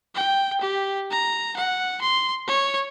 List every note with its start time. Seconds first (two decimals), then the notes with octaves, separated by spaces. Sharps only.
0.15 G5
0.61 G4
1.11 A#5
1.56 F#5
2.02 C6
2.48 C#5